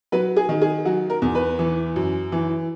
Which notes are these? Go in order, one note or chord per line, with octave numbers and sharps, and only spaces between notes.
F#3 B4
G#4
D#3
G#4
F#3 F#4
A#4
E2
B4
E3
F#2
E3